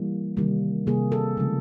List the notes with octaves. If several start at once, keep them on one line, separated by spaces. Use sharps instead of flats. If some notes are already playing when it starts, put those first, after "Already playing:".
Already playing: E3 G3 A#3
C3 D#3 G3 A#3
C3 D#3 G3 A#3 G#4
A4
C#3 F3 G#3